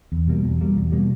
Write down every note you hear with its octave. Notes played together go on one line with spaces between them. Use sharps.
E2
B2 G3 A#3
E2
B2 G3 A#3
E2
B2 G3 A#3